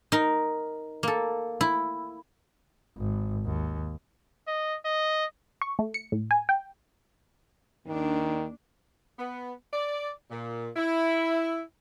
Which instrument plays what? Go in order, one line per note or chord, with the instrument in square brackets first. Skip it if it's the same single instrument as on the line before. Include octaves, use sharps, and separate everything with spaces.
[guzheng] D#4 A#4
A#3 A4
E4
[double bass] G#1
D#2
[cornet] D#5
D#5
[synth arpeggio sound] C#6
A3
C#7
A2
G#5
G5
[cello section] D#2 D4 [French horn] D#3
[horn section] B3
D5
A#2
E4